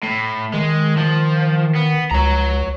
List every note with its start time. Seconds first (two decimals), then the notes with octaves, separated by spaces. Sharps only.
0.03 A2
0.54 D#3 G#3
0.97 F3
1.76 B3
2.11 C#2 C#5 A#5